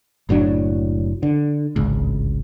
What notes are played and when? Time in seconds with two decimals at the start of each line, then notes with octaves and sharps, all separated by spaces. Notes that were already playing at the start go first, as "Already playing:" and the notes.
0.29 F#1 A2 F#3 D4
1.23 D3
1.76 D1 G#1 C#2